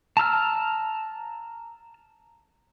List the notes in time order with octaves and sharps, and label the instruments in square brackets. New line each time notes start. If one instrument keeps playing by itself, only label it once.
[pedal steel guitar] A5 A#5 E6 F6